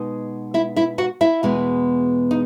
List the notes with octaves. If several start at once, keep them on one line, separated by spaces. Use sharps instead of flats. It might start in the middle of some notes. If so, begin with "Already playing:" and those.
Already playing: B2 G#3 D#4
E4 E5
E4 E5
F#4 F#5
E4 E5
E2 B2 G#3 B3
D#4